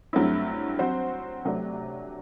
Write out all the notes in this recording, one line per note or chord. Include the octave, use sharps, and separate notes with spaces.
G2 F#3 A3 C4 E4
F#3 C4 F#4 C5
C3 F#3 A3 D4